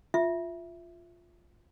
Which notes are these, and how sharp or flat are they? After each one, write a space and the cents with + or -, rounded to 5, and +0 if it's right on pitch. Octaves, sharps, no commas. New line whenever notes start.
F4 +0 E5 +10